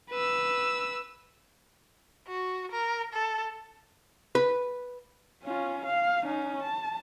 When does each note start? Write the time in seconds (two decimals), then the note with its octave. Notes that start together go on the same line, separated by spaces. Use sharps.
0.10 B4 E6
2.27 F#4
2.72 A#4
3.13 A4
4.35 B4
5.43 C#4 F4
5.85 F5
6.24 C#4 D#4
6.62 A5